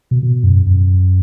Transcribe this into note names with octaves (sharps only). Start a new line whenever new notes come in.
B2
B2
F#2
F#2